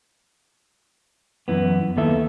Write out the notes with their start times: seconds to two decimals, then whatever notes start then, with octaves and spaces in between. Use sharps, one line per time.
1.48 F#2 E3 B3
1.97 D#2 B3 A4 E5